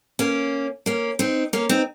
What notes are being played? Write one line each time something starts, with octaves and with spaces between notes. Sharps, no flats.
A#3 C#4
A#3 C#4
C4 D#4
A#3 C#4
C4 D#4